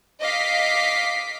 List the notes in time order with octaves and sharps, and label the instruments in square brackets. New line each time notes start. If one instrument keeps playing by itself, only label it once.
[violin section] D#5 F5 D6 B6 C7